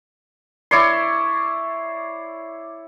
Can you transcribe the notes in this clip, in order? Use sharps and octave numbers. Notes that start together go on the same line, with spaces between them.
E4 C#5 D5 C6